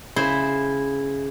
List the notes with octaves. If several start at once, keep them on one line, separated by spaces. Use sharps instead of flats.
C#3 E4 C5 C6